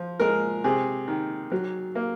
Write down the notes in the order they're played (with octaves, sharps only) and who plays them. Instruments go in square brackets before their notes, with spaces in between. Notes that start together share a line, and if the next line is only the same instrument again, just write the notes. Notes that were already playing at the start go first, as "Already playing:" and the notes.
Already playing: [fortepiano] F3
G#3 A#4
C3 G#4
D#3
F#3
A#3